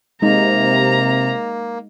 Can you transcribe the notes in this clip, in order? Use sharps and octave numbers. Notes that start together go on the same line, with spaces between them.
C3 G#3 A#3 D#4 A#5